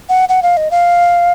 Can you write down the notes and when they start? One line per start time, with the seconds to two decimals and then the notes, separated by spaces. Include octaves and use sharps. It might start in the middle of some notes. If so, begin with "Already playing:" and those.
0.09 F#5
0.29 F#5
0.43 F5
0.57 D#5
0.71 F5